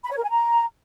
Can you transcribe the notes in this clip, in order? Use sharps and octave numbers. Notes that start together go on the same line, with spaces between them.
B5
C#5
A#4
G#5
A#5